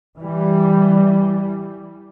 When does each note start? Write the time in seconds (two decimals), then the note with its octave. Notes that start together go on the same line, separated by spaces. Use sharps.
0.17 E3 G3